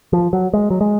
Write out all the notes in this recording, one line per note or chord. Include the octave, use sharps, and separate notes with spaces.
F3
F#3
G#3
F#3
G#3